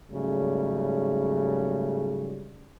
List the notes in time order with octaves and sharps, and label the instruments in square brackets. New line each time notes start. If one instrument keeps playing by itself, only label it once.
[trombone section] G#2 C#3 F#3 G3 A3